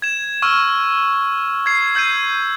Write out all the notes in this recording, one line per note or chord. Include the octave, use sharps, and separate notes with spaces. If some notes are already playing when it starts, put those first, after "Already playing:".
G#6 E7
C#6 E6 F6
G#6 C7
E6 G6 G#6 C7 D#7